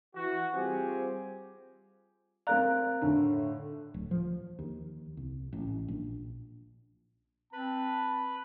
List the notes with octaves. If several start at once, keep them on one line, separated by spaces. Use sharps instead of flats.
E3 F#4
G3 C4 F4 G4 G#4
C4 A#4 D5 F5 A#5 F#6
A2 D3
D1
F3
D#2
C2
A1
A#1
C4 B4 A5 B5